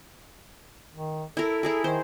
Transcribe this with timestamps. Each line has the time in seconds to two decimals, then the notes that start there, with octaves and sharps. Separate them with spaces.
0.94 D#3
1.37 E4 A4 A#4
1.63 E4 G#4 A#4
1.84 D#3 C5